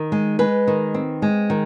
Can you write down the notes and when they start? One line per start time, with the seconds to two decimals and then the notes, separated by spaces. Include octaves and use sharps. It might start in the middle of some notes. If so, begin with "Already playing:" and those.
Already playing: D#3
0.12 G#3
0.39 G#3 B4
0.67 D#3
0.94 C4
1.22 G#3
1.50 D#3